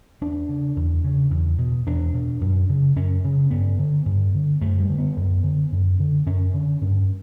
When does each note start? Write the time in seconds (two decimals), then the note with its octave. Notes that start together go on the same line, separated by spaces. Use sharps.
0.21 E2 D4
0.49 C#3
0.76 E2
1.04 C#3
1.31 E2
1.58 B2
1.86 E2 D4
2.14 B2
2.41 F#2
2.69 C#3
2.96 F#2 C#4
3.24 C#3
3.51 G2 B3
3.79 D3
4.06 G2
4.34 D3
4.61 F#2 A3
4.80 G3
4.89 D3
4.98 B3
5.17 F#2
5.43 D3
5.72 F#2
5.99 D3
6.26 F#2 C#4
6.54 D3
6.81 G2